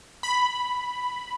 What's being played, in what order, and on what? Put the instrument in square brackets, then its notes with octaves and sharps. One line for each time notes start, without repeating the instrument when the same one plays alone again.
[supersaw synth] B5